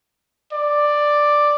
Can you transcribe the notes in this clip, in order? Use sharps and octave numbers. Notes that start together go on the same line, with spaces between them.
D5